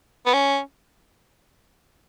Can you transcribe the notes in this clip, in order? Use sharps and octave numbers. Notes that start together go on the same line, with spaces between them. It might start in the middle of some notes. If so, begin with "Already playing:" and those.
B3
C#4